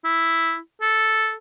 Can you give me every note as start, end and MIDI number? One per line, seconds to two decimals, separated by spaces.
0.05 0.58 64
0.82 1.35 69